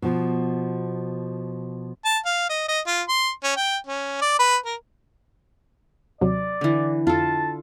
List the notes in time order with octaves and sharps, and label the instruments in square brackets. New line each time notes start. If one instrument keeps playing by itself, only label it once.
[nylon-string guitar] B2 F3
[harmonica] A5
F5
D#5
D#5
F4
C6
C#4
G5
C#4
D5
B4
A#4
[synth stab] D#2 C3 F#3 [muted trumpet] D5
[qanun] D3 E3
[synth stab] F2 [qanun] F4 A4 [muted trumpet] A5